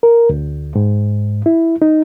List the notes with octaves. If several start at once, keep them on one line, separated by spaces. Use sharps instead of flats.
A#4
D2
G#2
E4
D#4